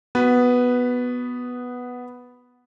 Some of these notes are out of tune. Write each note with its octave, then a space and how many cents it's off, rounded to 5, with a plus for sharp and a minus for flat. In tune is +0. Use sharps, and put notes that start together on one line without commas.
B3 +0 F#4 +0 B4 +0